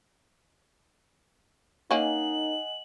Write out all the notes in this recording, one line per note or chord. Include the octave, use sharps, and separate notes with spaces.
A#3 C#4 D#4 D#5 F#5 G#5 F#7